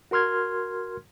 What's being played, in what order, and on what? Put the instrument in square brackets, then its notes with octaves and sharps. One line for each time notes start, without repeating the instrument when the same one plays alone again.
[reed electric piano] F#4 A#4 C6 F6 G#6